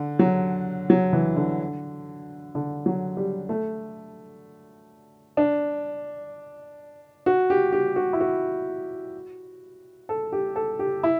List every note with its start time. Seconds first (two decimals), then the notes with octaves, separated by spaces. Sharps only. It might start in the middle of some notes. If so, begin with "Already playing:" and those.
Already playing: D3
0.19 F#3
0.90 F#3
1.13 E3
1.36 D3
2.55 D3
2.86 F#3
3.17 G3
3.49 A3
5.37 D4
7.26 F#4
7.50 G4
7.72 G4
7.96 F#4
8.13 E4
8.20 F#4
10.09 A4
10.32 G4
10.56 A4
10.79 G4
11.03 E4